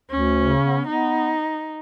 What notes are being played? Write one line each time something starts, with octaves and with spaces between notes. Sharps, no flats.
D2 C#4
C#3
B3
B3 D#4